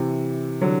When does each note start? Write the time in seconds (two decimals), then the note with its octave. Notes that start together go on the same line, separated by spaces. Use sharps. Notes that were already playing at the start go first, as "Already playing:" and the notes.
Already playing: C3 E3
0.61 D3 F#3